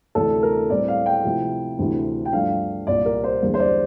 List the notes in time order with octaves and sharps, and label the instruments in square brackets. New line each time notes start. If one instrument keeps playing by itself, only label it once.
[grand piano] D2 C3 E3 A3 D4 A4
A#4
A2 G3 C4 E4 D5
F5
G5
C3 F3 A3 C4 E4
D2 C3 E3 A3 E4
G5
G2 F3 A3 D4 F5
C2 A#2 G3 D5
A#4
C5
E2 D3 G3 A#3
C5
D5